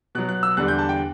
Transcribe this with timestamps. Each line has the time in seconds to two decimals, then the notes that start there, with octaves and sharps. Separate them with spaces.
0.15 B2 F#3 F#6
0.29 F#6
0.43 E6
0.57 E2 D3 G3 F#6
0.68 G6
0.79 A5
0.89 G5